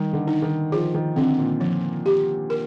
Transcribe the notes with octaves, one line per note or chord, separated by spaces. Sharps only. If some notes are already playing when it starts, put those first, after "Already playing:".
Already playing: D#3 G3
D3
D#4
D#3
F3 G#4
D#3
D3 C4
A#2
F3
G4
A#4